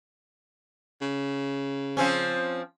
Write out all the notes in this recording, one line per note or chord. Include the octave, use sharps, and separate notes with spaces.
C#3
F3 C4 C#4